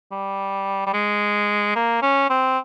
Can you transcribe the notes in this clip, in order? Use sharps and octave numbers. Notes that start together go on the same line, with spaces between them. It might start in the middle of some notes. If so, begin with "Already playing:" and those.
G3
G3
G#3
A#3
C#4
C4